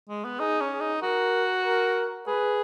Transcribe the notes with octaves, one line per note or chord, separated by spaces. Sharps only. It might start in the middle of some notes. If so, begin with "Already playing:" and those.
G#3
B3
D#4 G#4
C#4
G#4
D#4
F#4 A#4
A#4
G#4 B4